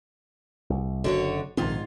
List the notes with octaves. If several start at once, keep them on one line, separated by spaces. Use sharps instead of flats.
C2
F#1 D3 F#4 C#5
A#1 G#2 D#3 C4 F4